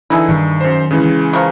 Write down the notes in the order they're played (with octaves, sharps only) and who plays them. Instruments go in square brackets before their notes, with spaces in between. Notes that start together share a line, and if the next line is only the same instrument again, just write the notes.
[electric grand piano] D3 E3 D#4 [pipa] E4 G#4
[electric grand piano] G2 [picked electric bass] D#3
[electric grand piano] F#2 C5
C#3 E3 G#3
[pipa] F3 A#4 C#6